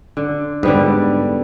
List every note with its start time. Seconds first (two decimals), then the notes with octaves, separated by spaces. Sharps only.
0.17 D3
0.63 G#2 D3 G3 B3